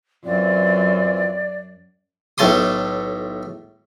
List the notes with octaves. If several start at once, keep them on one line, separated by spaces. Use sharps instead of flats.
F#2 E3 C4 F4 D5
B1 A2 A3 A5 C6 D#6